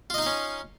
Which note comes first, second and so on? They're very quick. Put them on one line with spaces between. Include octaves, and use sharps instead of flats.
F4 D#5 D#4 F5 C#4